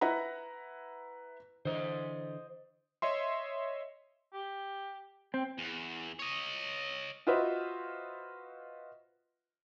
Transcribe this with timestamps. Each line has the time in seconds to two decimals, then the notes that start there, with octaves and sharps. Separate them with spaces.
0.01 E4 B4 F#5 A#5
1.65 D3 E3 C5 D#5
3.02 C#5 D#5 E5 C6
4.33 G4
5.34 C4 G5
5.58 E2
6.19 C#5 D#5
7.27 F4 F#4 B4 C5 D#5 E5